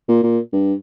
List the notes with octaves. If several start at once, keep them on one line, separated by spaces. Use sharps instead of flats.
A#2
A#2
G2